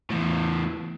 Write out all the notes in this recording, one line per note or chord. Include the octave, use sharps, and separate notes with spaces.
E2 A2